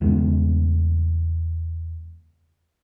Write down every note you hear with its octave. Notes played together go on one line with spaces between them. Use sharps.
E2 C#3 G#3 B3